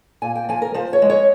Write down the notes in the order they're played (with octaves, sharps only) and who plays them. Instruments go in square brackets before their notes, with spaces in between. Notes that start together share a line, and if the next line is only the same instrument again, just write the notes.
[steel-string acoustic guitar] A#2 G#5
G5
F3 G#5
A#4
F3 C5
C#5
G#3
C#5